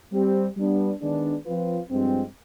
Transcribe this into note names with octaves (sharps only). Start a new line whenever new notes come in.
G3 C4 G4
G3 B3 D4
D#3 G#3 B3 D4
F3 C4 F4 B4
G2 F3 G#3 C4